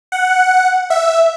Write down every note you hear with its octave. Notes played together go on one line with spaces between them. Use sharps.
F#5
E5